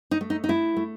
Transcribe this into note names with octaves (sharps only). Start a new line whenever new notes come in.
D#4
A3
D#4
D#4
A3 E4
A3